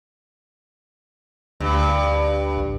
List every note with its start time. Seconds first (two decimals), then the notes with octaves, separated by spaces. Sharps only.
1.60 D2 G2
2.57 A1